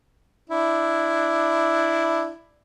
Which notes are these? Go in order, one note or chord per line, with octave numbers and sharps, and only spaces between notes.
D4 E4